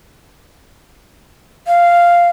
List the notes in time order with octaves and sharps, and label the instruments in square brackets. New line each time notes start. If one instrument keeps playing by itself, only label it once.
[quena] F5